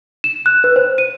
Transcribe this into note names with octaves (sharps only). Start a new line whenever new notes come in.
E7
F#6
B4
C5
D#7